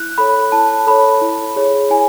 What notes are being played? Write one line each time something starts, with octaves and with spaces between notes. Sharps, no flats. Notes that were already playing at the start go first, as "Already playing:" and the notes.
Already playing: E4 F#6
A4 C#5 B5
E4 A5
A4 C#5 B5
E4
G#4 C#5
E4 G#5